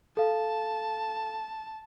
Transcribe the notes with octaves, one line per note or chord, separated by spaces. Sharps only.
A4 F5 A5